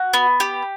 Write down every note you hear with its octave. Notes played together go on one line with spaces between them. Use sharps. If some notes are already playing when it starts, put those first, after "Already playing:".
Already playing: F#4
B3
G4